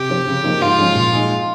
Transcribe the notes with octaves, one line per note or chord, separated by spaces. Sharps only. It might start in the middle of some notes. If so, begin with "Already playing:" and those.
Already playing: C3 G4
F3 C4
C#3
F3 A#3 D#4
G#2 F4
F3 G#3 C#4
A#2
G#3 D#4 G#4